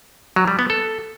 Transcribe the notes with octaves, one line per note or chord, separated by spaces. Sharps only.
F#3
G3
B3
A4